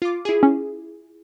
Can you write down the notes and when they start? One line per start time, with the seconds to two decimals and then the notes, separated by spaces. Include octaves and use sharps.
0.02 F4 D6
0.25 E4 G#4
0.43 C#4